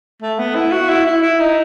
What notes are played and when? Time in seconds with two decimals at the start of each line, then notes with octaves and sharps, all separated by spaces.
0.22 A3
0.39 B3
0.55 E4
0.72 F#4
0.89 E4
1.06 E4
1.23 E4
1.40 D#4